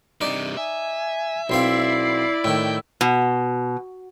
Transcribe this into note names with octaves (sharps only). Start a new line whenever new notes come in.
G2 C3 D#4 D5
E5 G#5
B1 C4 E4 D5 F5 C7
A2 D#3 G5 E6
B2